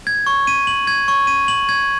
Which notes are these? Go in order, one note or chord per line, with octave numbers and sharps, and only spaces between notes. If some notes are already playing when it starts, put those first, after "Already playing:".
G#6
C#6
D#7
F#7
G#6
C#6
D#7
F#7
G#6